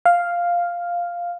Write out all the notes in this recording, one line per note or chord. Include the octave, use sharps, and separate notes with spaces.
F5